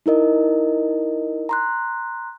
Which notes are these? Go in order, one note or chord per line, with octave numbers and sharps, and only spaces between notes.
D#4 E4 A#4 D#5
A#5 C6 F#6